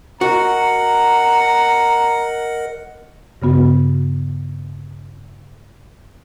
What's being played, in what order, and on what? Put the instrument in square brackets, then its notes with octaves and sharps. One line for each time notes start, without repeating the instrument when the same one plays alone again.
[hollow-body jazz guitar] F#4 [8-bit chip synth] A#4 D#5 [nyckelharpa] F#5 [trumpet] A#5
[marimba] G2 C#3 B3 F#4